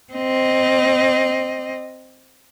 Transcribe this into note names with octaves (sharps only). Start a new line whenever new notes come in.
C4 D#5